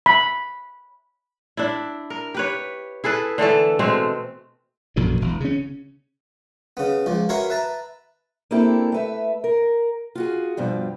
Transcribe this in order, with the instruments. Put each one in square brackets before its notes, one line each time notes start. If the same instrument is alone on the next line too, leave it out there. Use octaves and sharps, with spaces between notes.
[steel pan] B5
[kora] D4 E4
A#4
G4 B4 C#5
E4 G#4 A4 B4
D3 E3 A3 A4
B2 G#3 A3 C4
[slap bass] A#1 F#2 B2 D3
E1
C#3 C#4
[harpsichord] C#3 B3
C#2 F3
F#4 A#4 B4 C#5 E5 C6
B4 E5 A5 A#5
[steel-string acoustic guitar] A#3 C4 D4 E4 G4 A4
A3 B4 E5
A#4
F4 F#4 G#4
G2 B2 F3 G3